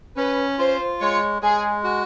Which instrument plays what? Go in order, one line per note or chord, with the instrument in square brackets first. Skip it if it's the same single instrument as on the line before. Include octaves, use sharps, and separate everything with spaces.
[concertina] C#4 [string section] B4
[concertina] F4 [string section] C5
[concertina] G#3 [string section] C#5
[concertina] G#3 [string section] G#4
[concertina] F#4